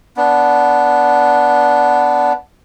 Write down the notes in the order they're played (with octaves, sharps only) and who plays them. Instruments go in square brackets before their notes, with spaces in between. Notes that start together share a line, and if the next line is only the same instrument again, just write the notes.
[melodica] B3 D4